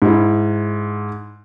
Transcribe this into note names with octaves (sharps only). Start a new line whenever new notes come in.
G#2 E4